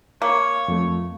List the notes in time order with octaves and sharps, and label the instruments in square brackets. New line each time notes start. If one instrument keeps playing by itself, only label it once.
[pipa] A#3 [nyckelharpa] C#5
[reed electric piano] F2 F3 A3